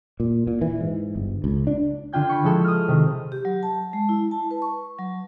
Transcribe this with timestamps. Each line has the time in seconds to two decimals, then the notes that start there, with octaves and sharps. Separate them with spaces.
0.20 A#2
0.47 A#2
0.61 E3
0.81 G#2
1.16 G1
1.44 C#2
1.67 D4
2.13 D3 D4 F4 G5 G#6
2.29 B5 C#6
2.44 F3 G#3 E4 A4
2.64 D#6 F6
2.88 C3 D#3
3.32 G4
3.45 F#3
3.63 A5
3.93 G#3
4.09 E4
4.31 A5
4.51 B4
4.62 C#6
4.99 F#3